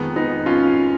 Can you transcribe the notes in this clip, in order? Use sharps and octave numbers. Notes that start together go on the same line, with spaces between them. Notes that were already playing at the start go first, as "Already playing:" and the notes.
Already playing: F2 D#3 G#3 B3
B3 D#4
C#4 F4